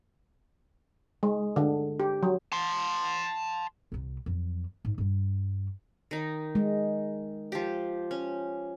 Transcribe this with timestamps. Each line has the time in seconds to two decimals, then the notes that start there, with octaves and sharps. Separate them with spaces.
1.23 G#3
1.56 D3
2.00 G4
2.23 F#3
2.52 A5 C6
3.92 C2 C3
4.26 F2 F#3
4.85 G#2
4.98 G2 G3
6.11 D#3 D#4
6.55 G#3
7.52 F3 G4
8.11 C#4